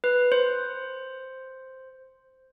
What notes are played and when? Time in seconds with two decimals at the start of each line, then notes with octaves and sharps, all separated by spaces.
0.04 B4
0.32 C5